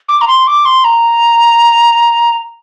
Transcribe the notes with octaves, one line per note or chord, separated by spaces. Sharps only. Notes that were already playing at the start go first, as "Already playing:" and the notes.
D6
A#5
C6
D6
C6
A#5